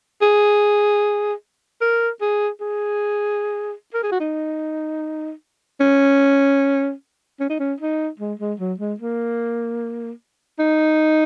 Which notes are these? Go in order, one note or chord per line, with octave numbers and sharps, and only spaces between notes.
G#4
A#4
G#4
G#4
A#4
G#4
F#4
D#4
C#4
C#4
D#4
C#4
D#4
G#3
G#3
F#3
G#3
A#3
D#4